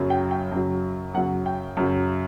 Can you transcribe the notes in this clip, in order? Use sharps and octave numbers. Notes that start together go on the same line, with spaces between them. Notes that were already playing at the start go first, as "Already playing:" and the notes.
Already playing: F#2 C#3 F#3
G5
G5
F#2 C#3 F#3
F#2 C#3 F#3 F#5
G5
F#2 C#3 F#3